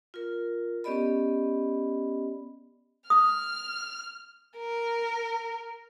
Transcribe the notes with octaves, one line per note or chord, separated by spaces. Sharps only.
F4 A#4
B3 C#4 G4 D5 D#5 B5
D#6 F6
A#4